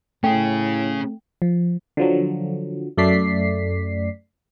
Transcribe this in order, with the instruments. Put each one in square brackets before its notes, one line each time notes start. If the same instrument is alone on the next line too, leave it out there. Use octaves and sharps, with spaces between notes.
[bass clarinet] A2 [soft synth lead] A3 [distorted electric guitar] C#4 G#4 [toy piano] G5
[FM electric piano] F3
D3 F3 F#3
F#2 A3 D5 B6 C7